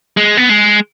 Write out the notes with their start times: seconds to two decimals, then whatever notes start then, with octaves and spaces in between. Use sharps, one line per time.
0.17 G#3
0.37 B3
0.49 G#3